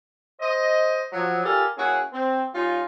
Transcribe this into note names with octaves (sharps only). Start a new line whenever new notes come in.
C5 D#5
F3 F#3
F4 G4 A4 A#4 D5 G#5
A#3 C#4 E4 F#4 G#4
C4
G3 C#4 D#4 F4